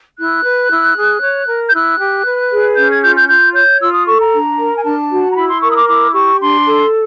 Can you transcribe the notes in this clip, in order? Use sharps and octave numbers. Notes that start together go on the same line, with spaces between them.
E4 F#6
B4
E4
G#4
C#5
A#4
G6
E4 F#6
G4
B4
G#4
C#4 G6
G#6
F4 G6
G6
F4 G6
C#5 G6
F4 E6
D#6
A4 C#6
A#5
D4
A#4
G#5
D4 A5
F#4
A#5
E4 B5
C6
A#4 C#6
D#6
D6
E4 D6
G4 C#6
D4 C6
A4